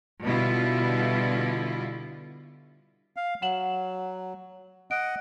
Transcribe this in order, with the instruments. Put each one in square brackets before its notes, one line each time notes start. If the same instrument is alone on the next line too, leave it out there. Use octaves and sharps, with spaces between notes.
[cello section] B2 D3 G3 E4 F4
[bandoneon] F5
[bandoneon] F#3 [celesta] F#5 E7 F#7
[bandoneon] D#5 F#5 [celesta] D7